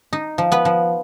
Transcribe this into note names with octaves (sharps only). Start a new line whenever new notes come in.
D#4
F3
B3 B4
F3